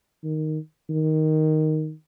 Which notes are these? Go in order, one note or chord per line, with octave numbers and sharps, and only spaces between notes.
D#3
D#3